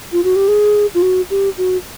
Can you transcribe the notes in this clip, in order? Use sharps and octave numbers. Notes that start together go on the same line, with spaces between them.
F4
F#4
G4
G#4
F4
F#4
G4
F#4